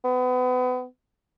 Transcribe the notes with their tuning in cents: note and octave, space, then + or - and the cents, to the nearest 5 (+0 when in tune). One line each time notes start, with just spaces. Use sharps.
B3 +30